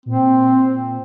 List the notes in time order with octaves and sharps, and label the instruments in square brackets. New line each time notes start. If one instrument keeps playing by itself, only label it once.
[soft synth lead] A#2 [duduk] C4